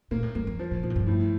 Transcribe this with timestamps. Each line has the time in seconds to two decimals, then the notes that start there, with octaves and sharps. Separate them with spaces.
0.11 A#2 A#3
0.23 A2
0.35 G2 A#3
0.47 F2
0.59 F3
0.71 A2
0.83 A#2 F3
0.90 A2
0.96 G2
1.07 A2